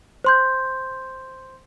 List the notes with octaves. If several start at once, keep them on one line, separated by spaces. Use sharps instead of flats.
C5 C6 G6